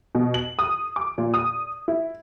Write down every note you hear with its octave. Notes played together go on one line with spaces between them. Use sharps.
B2
F#7
D#6
D6
A#2
D#6
E4